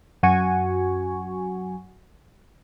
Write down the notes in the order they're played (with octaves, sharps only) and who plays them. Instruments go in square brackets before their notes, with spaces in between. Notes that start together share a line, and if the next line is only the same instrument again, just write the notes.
[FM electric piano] F#2 F#4 G#5 C#6